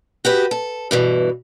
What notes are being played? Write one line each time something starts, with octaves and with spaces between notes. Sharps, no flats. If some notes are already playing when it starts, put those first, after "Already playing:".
F#4 G4 B4
A4
G2 B2 E3